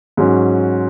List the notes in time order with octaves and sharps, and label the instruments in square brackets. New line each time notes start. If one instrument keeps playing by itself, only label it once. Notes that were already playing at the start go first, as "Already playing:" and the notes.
[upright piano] G#2 F#3 C#4